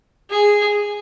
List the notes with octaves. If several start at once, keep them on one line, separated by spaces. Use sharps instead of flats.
G#4